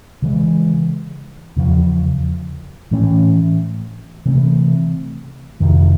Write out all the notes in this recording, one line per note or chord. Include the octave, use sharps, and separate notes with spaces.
C#3 E3 G#3
E2 C#3 F3
A2 E3 A3 C#4
C3 E3 A3 C4
F2 C3 D#3